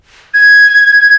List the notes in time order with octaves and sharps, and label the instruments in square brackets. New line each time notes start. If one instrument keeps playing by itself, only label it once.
[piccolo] G#6